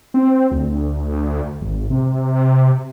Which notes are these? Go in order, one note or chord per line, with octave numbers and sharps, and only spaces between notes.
C4
D2
G#1
C3